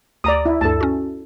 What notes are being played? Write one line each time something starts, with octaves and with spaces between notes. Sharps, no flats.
D2 D5 A#5 D#6
E4
D2 G2 A4 A5
C#4 F#4